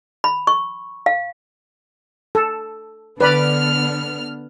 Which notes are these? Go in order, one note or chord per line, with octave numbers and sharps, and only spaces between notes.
B5
C#6
F5
A4
D3 B3 B4 D5 B5 F6